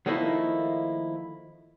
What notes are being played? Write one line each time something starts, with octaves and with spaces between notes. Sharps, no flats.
D#3 F3 A3 A#3 D#4 E4